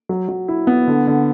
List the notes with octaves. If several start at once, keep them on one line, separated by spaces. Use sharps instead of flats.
F#3
F#3
E4
B3
D3
D3